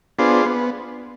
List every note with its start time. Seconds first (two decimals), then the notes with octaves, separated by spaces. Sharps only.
0.18 B3 D4 F4 G#4 C5
0.46 B3